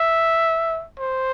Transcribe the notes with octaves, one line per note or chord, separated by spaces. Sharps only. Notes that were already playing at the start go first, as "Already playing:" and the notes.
Already playing: E5
C5